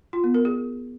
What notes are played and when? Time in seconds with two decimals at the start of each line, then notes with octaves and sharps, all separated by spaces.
0.13 F4
0.24 B3
0.34 A#4
0.45 G#4